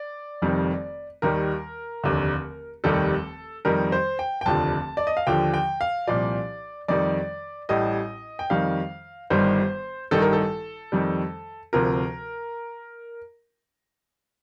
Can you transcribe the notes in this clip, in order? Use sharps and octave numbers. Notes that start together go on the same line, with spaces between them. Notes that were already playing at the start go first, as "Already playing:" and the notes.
Already playing: D5
F1 F2 D#3 G3
D#2 D#3 G3 A#4
F1 D#2 D3
F1 D#2 D#3 G3 A4
F2 D#3 G3 A#4
C5
G5
G5
F1 D#2 D3 F3 A5
D5
D#5
F5
D#2 D3 F3 G5
G5
F5
C2 A#2 F3 D5
F2 D#3 G3 D5
A1 A2 G3 D#5
G5
F2 D#3 G3 F5
G1 G2 D#3 G3 C5
A1 G2 D#3 G3 A4
A#4
A4
F2 D#3 G3
D2 C3 F3 A#4